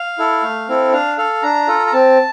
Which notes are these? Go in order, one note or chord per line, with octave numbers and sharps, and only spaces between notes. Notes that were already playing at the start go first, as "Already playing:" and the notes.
Already playing: F5
E4 A4
A3
C4 E4 A4
D4 F5
A4 F5
D4 A#5
F4 A4
A#5
C4 A5